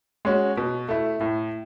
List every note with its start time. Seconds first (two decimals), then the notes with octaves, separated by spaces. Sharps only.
0.25 G#3 C#4 F#4
0.57 B2
0.88 A3 E4
1.21 A2